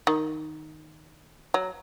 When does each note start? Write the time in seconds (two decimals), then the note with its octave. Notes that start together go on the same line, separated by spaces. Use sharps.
0.07 D#3
1.54 F#3